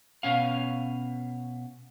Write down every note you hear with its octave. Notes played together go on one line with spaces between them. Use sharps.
B2 C#4 F5